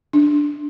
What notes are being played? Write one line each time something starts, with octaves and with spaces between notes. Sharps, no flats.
D4